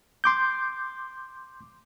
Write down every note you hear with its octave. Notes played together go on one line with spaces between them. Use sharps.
C6 D6 G6